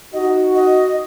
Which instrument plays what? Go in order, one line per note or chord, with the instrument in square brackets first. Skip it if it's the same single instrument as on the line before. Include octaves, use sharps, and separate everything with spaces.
[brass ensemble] D#4 F#4 [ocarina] D#5
[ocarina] D#5